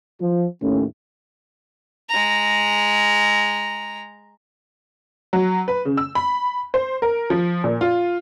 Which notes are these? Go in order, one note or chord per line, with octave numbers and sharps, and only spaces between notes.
F3
D#2 A2 A3 C#4
G#3 A#5
F#3
B4
C#3
E6
B5
C5
A#4
F3
A#2
F4